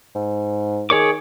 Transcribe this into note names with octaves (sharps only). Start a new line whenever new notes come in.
G#2
D#3 G#4 C#5 D6